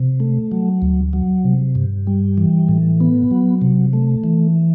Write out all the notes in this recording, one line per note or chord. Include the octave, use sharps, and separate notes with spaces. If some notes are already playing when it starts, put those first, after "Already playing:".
Already playing: C3
A3
F#3
D2
F#3
C3
G2
G3
E3
A2
B3
F#3
C3
A3
E3